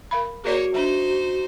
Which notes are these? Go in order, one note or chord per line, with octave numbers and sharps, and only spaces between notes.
A#4 F5 B5
A#3 F#4 G#4 A#4 C#5 D5
G3 D4 D#4 C5